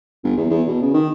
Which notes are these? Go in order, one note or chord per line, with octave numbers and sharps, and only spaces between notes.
G1
E2
E2
B2
C#3
D#3